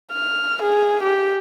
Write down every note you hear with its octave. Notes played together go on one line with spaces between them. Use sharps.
F6
G#4
G4